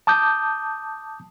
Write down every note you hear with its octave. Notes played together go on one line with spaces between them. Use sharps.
A5 D6 D#6 G6